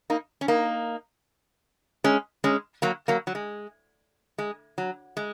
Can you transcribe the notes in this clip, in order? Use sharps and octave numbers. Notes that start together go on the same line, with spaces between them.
A#3 D#4
C#4
A#3 D#4
G#3 C#4
G#3 C#4
F#3 A#3
F#3 A#3
F#3
G#3
G#3
F#3
G#3